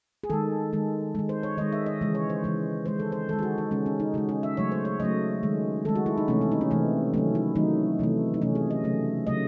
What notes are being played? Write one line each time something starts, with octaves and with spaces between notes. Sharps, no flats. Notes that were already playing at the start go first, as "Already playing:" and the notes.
G#4
D#3 G#3 A4
D#3 G#3
D#3 G#3
C5
C#5
D#3 G#3 D#5
E5
D#5
C#3 E3 G#3
C#5
C5
C#3 E3 G#3
D#3 G#3 C5
A4
C5
D#3 G#3 A4
G#4
F#4
D#4
C#3 G#3 C#4
C#4
D#4
C#3 G#3 F#4
G#4
E5
C#3 F#3 A3 C#5
C5
C#5
C#3 F#3 A3 D#5
D#3 G#3
D#3 G#3 A4
F#4
E4
D#4
C3 E3 A3 C#4
E4
D#4
C#4
C3 E3 A3 C4
D#3 F#3 A3 C#4
E4
D#3 F#3 A3 D#4
C3 E3 A3
D#4
C3 E3 A3 C#4
G#4
D#5
C#3 F#3 A3
C#3 F#3 A3 D#5